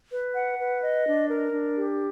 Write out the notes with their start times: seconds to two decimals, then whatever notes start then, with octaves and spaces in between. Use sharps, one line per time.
0.11 B4
0.35 F#5
0.58 B4
0.82 D#5
1.06 D4
1.29 A#4
1.52 D4
1.76 G4